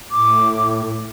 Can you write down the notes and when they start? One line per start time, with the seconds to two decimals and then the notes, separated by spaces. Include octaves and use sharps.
0.11 A2 D6